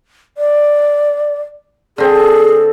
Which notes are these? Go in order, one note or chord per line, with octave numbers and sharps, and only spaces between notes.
D5
D3 C4 G#4